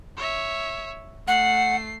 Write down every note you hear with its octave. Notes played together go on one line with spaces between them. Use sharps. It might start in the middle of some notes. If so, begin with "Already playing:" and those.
C#5 E5
A3 F#5 C7